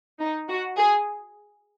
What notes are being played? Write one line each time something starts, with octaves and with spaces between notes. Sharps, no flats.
D#4
F#4
G#4